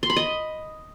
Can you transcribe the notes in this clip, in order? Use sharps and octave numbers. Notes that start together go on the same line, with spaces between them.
C6
B5
D#5